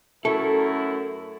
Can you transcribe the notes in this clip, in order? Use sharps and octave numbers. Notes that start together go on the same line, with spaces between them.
F#2 A3 E4 A4 A#4